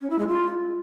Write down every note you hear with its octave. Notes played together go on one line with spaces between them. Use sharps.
C#4
E4
G#3
F4